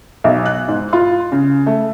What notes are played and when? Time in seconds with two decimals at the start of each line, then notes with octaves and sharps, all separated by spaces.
0.24 B1
0.46 F#6
0.68 G#2
0.93 F4
1.32 C#3
1.66 A3